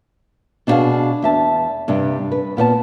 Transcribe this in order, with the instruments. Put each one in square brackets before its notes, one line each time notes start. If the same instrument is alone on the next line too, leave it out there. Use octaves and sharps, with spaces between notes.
[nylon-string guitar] B2 D4 D#4 F#4 G#4 F5
E2 E5 A5
G2 C3 D4
B4
A#2 B3 D5 A5